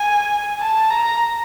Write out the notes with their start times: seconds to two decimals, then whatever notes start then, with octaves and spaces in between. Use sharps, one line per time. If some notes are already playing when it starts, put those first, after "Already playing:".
Already playing: G#5
0.60 A5
0.90 A#5